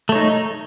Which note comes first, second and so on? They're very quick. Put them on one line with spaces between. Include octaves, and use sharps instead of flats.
A3 C#5 D#4